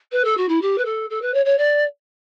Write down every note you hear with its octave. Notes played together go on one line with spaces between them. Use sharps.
B4
A4
F#4
E4
G4
B4
A4
A4
B4
C#5
C#5
D5